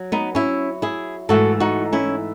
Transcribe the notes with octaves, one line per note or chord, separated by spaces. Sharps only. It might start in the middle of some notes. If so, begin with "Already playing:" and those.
Already playing: F#3
B3 D#4
C#4 E4
E4 G#4
G#2 E3 A3 F#4 A4
D#4 F#4
C#4 E4